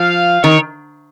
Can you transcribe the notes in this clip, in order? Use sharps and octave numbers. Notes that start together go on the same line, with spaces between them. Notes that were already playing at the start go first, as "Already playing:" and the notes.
Already playing: F3 F5
D#3 C#5